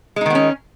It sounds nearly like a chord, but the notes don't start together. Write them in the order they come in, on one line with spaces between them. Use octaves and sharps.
G#3 D#4 D#3 B3 C#4